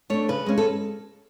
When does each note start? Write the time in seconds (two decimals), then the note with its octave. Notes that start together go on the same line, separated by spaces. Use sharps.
0.10 A3 D4 C#5
0.29 C#3 B4
0.46 G#3 C#4
0.58 A4